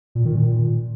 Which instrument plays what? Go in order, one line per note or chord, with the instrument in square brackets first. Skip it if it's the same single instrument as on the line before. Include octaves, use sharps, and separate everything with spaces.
[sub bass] A#2
D#3
A#2